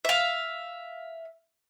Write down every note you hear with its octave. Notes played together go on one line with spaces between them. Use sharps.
E5 F5